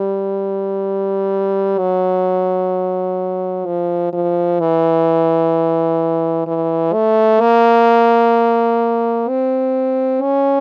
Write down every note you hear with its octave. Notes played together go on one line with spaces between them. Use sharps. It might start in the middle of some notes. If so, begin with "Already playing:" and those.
Already playing: G3
F#3
F3
F3
E3
E3
A3
A#3
C4
C#4